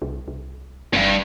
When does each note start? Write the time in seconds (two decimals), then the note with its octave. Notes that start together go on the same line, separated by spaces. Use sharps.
0.02 C2
0.28 C2
0.93 G1 E2 G2